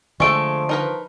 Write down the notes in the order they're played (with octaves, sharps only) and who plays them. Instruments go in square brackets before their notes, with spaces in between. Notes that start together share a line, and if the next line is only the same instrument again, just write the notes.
[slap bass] D3 [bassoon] F3 [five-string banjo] G#3 A3 A4 [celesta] C#6 D7
[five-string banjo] D#4 A#4 B4